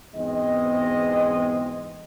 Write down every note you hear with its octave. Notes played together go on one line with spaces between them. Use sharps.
E2 G#2 B2 G#3 C4 D#5